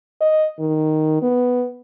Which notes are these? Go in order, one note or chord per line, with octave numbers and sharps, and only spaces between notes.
D#5
D#3
B3